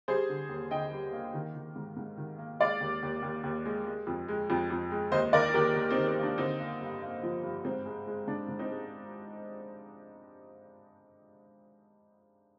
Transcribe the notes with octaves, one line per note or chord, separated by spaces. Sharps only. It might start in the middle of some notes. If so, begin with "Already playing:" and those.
G3 G#4 C5
D3
D#2
D3 D#5 G5
G3
A#3
D#3
D#3
G#2
G#2
D#3
A#3
G#3 D5 F5
D#2
D#2
D#2
D#2
G#3
G#3
F2
G#3
F2
F2
G#3
D#2 C5 D#5
D#3 A#4 D5
D#2 G4 A#4
D#2
C4 D#4
D#3
C4
A#3
D4
D3 C4 D#4
A#3
G2
A#3
F3
G2
G#2 C4
G#3
G#3
G#2 D4
G#2
C4 D#4
G#3